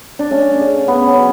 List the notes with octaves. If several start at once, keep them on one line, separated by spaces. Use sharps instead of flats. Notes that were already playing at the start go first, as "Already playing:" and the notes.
D4
A3 C#4
C#3
C#3 B3
C#4
F#3